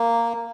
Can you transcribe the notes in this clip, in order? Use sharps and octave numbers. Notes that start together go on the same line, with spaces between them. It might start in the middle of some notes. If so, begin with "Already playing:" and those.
Already playing: A#3